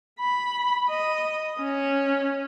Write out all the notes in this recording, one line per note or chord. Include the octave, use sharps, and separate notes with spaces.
B5
D#5
C#4